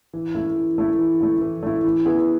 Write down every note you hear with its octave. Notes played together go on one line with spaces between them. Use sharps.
E3
A3 E4
E3
A3 E4
E3
A3 E4
E3
A3 E4
E3
B3 E4 G#4